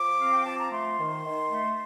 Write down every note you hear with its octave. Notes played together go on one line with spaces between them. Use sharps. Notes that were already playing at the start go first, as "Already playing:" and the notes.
Already playing: F3 D6
C4 F5
G5
F3 A5
A#5
A3 C6
D#3
D#3
A3